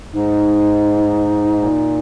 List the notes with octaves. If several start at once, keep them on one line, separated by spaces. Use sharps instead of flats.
G#2 D#4
A#2